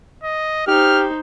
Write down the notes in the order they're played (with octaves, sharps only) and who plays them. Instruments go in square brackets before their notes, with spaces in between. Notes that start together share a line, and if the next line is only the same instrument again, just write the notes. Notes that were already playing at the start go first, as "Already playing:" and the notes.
[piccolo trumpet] D#5
[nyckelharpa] D#4 C5 [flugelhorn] G4 [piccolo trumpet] F6